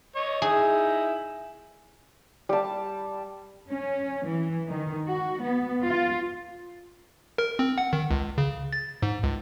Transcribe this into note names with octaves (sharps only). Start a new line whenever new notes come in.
C#5 D#5
D#4 E4 G#4
G3 A5
C#4
E3
D#3
F#4
B3
F4
A#4
C4
F#5
D#3
C#2
C#3
A6
G#2
C#2